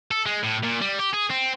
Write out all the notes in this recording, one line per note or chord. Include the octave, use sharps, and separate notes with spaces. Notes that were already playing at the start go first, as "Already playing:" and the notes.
A4
G#3
A2
A#2
G3
G4
G#4
C4